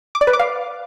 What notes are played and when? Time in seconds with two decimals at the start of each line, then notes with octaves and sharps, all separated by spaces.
0.15 D6
0.21 D5
0.27 B4
0.33 D6
0.39 F5